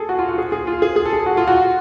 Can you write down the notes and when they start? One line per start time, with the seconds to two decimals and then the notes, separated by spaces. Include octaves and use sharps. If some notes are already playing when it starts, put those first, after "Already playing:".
Already playing: G#4 A4
0.09 F#4
0.19 F4
0.29 F#4
0.38 G#4
0.52 G#4
0.67 F4
0.82 G#4
0.96 G#4
1.05 A4
1.13 G#4
1.26 F#4
1.37 F4
1.47 F#4